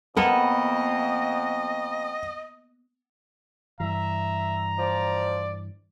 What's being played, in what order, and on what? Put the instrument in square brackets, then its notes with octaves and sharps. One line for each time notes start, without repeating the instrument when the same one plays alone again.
[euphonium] F2 [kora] A#3 B3 A4 [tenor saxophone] D#5 [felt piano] F#5
[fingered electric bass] G2 E3 [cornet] E5 [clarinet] A#5
[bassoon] F3 [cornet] D5